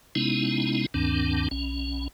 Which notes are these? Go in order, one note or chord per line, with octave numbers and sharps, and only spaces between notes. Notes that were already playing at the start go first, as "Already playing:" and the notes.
C3 G#3 B3 C#4 D#4 E4
D2 G2 D#3 C4 D4
B1 C#4